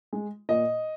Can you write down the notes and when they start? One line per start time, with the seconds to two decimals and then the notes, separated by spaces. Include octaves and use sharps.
0.13 G#3
0.49 A#2 D#5